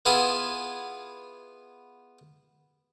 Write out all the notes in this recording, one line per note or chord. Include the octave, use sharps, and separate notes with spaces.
B3 E4 F4 G#4 F#5 G#5